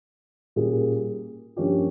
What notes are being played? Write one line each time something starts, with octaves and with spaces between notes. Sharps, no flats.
A#2 G3 A#3 C#4 G#4
G2 F3 A#3 C#4 G4